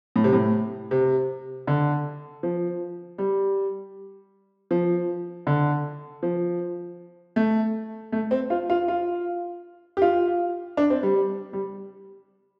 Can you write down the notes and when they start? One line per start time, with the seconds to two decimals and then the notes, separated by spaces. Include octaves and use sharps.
0.16 A2
0.24 C3
0.33 A2
0.91 C3
1.67 D3
2.43 F3
3.18 G3
4.71 F3
5.47 D3
6.23 F3
7.36 A3
8.12 A3
8.31 C4
8.50 F4
8.70 F4
8.88 F4
9.97 G4
10.02 F4
10.77 D4
10.90 C4
11.03 G3
11.53 G3